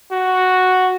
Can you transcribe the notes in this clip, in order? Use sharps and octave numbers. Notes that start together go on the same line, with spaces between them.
F#4